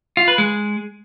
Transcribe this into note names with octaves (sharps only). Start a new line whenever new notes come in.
F4
B4
G#3